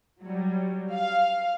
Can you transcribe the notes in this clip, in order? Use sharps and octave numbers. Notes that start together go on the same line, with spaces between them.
F#3 G3
F5